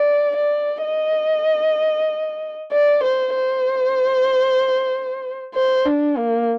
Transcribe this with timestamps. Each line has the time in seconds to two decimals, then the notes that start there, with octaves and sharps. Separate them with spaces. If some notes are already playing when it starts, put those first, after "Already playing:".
Already playing: D5
0.36 D5
0.84 D#5
2.72 D5
3.03 C5
3.35 C5
5.55 C5
5.86 D4
6.17 A#3